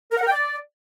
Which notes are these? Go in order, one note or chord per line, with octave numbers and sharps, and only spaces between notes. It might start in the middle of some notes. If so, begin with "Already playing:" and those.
A#4
F#5
A#4
G5
D5